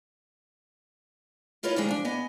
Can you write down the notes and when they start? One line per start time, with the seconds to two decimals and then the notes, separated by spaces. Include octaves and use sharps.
1.63 E4 F4 A#4 B4 C#5 D#5
1.76 D3 D#3 F3 G3 G#3
1.89 F3 D4
2.05 B3 D#5 G#5